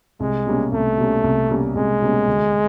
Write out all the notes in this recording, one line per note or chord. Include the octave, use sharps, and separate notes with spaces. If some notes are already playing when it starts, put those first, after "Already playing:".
C2 G#3
B2 G3 A#3 C#4
C2 A3
B2 G3 A#3 C#4
C2
B2 G3 A#3 C#4
C2 G#3
B2 G3 A#3 C#4
D2